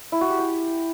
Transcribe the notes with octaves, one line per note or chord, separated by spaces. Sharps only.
E4
F#4
G4
G5